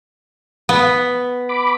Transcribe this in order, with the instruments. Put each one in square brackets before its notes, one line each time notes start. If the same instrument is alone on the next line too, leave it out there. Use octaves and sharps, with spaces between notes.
[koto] B3
[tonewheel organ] B5 D6